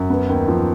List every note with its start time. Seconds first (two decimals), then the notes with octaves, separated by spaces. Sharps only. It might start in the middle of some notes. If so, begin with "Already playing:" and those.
Already playing: F#2
0.10 B3
0.29 D#2
0.48 F3